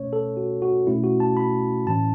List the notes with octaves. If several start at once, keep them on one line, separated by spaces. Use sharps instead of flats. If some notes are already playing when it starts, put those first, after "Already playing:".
Already playing: B2 A3 C#4 C#5
A4
F#4
F#4
B2 A3 C#4 E4
F#4
A5
B5
A2 E3 C#4 A5